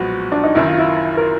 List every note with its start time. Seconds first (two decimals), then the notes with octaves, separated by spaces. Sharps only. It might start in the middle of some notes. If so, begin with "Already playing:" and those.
Already playing: B1 A#2 F3 G#3 B3 F#4
0.32 D4
0.43 D#4
0.55 F#1 F#2 D#3 E4
0.67 F4
0.78 E4
1.17 A#4